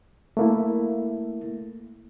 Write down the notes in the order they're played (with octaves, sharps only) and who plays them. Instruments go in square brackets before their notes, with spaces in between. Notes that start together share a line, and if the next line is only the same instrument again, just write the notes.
[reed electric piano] A3 A#3 E4